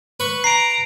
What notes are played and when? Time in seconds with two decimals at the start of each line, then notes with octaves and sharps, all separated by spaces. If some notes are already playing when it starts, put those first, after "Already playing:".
0.20 B4 C#6
0.44 A#5 C7 D7